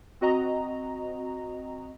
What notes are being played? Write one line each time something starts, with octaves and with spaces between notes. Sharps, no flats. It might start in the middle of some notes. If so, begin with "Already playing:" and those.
C4 F#4 D#5 A#5